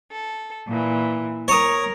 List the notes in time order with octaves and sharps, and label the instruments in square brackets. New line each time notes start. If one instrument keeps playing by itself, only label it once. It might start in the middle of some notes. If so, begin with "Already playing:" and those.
[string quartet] A4
A#2 E3
[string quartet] A#4 [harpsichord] C#5 D#6